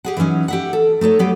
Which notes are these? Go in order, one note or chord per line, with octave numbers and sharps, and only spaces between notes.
G4 G#4 F#5
E3 F#3 A3 C#4 D#4
G4 E5 F#5
A4
A3 D#4 A4 C#5
F#3 B3 G4